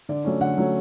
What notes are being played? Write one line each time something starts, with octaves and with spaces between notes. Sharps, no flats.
D3 D5
F#3 A3 C#4
D3 F#5
F#3 A3 C#4